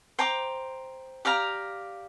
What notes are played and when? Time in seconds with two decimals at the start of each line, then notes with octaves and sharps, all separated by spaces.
0.19 C5 G5 A#5 D6
1.25 G4 D5 F5 A#5